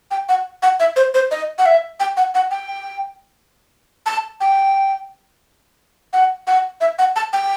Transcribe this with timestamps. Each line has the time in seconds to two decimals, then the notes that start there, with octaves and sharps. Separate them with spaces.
0.11 G5
0.29 F#5
0.63 F#5
0.80 E5
0.96 C5
1.14 C5
1.31 D#5
1.58 F#5
1.66 E5
2.00 G5
2.17 F#5
2.35 F#5
2.51 G5
4.06 A5
4.41 G5
6.13 F#5
6.47 F#5
6.81 E5
6.99 F#5
7.16 A5
7.33 G5